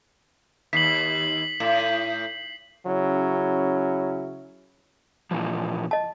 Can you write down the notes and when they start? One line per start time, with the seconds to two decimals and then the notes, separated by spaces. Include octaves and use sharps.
0.73 D#2 B6 C7 F#7
1.60 A2
2.85 C#3 F#3 C#4 E4
5.31 A#2 E3 F3
5.91 D#5 A5